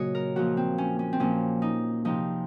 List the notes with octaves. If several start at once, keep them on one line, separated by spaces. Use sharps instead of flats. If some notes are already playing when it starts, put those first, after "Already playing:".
Already playing: A#2 C#3 F#3 F#4 C#5 D#5
A#4
A#2 F3 F#4
C4
C#4
C#4
C4
A#2 F3 C#4
D#4
C3 F3 D#4